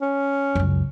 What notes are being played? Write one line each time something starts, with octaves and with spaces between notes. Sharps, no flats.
C#4
C#2 F#2